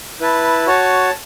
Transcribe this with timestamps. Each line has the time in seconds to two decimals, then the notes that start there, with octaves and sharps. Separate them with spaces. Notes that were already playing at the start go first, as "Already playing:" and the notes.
0.20 E4 B4 A5
0.67 F#4 C#5 A5